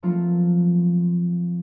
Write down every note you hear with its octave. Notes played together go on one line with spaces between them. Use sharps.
F3 F#3 A3 A#3 C4 F4